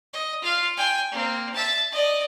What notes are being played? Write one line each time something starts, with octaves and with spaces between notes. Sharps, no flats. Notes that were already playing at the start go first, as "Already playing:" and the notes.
D#5
F4 F5
G5 G#5
A#3 C4
E5 A5
D5 D#5